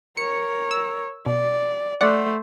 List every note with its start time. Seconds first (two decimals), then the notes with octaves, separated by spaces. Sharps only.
0.17 A#4 C#5 C#7
0.71 E6
1.26 B2 D5
2.01 A3 C5 D5 F#5